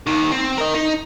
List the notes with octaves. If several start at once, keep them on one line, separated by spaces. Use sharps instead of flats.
D#2 D#3
C4
A#4 D#5
D#4